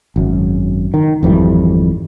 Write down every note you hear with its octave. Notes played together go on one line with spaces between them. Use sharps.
G#1 F#2
D#3
G#1 F2 E3 G3